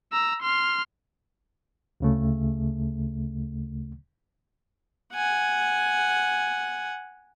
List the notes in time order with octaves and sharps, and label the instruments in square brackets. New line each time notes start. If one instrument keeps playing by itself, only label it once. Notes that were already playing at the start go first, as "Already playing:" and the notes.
[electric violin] A#5 E6
C6 F6
[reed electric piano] D2 C#3 A3
[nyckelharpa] F#5 G#5